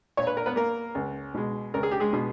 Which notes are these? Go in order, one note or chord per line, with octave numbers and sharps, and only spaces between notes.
A#2 C#5
B4
A#4
B3 B4
A#3 A#4
C#2
B2 G#3
C#2 A#4
G#4
G4
G#3 G#4
B2 G#3